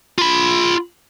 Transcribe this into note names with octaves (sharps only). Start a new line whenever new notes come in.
F4 B5